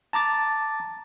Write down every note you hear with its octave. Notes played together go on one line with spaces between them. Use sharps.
A5 A#5 D6 A6